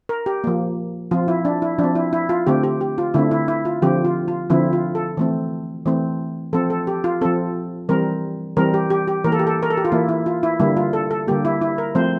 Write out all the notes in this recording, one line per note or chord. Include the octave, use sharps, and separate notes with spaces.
A#4
G4
F3 A#3
F3 C4 F4
E4
D4
E4
F3 C4 D4
E4
E4
F4
D3 A3 C4 G4
G4
G4
F4
D3 A3 C4 E4
E4
E4
F4
D3 F3 C4 G4
F4
F4
D3 F3 C4 E4
F4
A4
E3 A3 C4
E3 A3 C4
F3 C4 A4
A4
G4
F4
F3 C4 A4
E3 G3 C4 A#4
E3 G3 C4 A#4
G4
G4
G4
E3 A#3 A#4
A4
G4
A4
A#4
A4
G4
F4
E3 A#3 E4
E4
F4
E4
D3 G3 A#3 E4
F4
A4
A4
D3 G3 A#3 G4
E4
E4
A#4
F3 A3 C4 C5